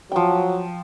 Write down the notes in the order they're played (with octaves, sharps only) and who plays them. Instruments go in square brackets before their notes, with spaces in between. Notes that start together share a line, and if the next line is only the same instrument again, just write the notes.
[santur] F3 G5 [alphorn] F#3